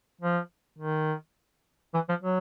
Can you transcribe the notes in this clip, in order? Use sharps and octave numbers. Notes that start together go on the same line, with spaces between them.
F3
D#3
E3
F3
F#3